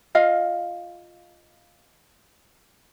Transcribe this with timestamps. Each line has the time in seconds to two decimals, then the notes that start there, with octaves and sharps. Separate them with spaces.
0.15 F4 D#5 F5